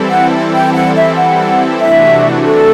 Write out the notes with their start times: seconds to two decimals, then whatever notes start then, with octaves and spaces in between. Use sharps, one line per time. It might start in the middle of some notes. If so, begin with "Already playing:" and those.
Already playing: E3 G3 C4 E4 A4
0.09 F#5
0.53 G5
0.74 F#5
0.95 E5
1.16 F#5
1.79 C3 E3 A3 D4 F#4 E5
2.44 A4